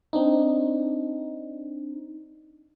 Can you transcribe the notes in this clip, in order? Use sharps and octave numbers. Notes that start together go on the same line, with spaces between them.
C4 D4 D#4